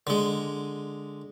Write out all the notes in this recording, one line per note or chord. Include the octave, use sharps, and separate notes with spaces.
D3 G#3